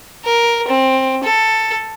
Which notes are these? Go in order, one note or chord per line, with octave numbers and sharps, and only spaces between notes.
A#4
C4
A4